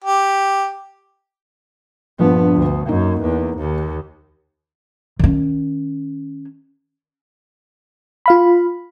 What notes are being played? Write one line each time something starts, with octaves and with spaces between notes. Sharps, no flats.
G4
A#1 G2 F3 B3
D2
F#2 A#3 D#4
E2
D#2
D#3 C#4
F4 F5 B5